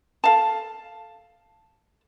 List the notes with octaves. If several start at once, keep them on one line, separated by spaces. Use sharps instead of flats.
A4 F5 A5